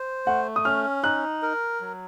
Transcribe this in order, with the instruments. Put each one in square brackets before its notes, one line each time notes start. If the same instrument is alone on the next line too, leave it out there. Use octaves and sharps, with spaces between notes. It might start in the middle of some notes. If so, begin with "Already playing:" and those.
Already playing: [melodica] C5
[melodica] A3 [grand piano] F#5
[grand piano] D#6
[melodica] C#4 [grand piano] F6
[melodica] D#4 [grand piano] F#6
[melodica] A#4
F#3